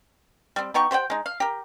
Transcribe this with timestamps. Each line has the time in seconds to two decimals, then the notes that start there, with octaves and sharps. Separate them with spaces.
0.56 G3 C4
0.74 B3 D#4 G4 C#6
0.91 G4 C5 F#5 G5
1.10 G#3 D#4
1.26 F5
1.40 G4 A#4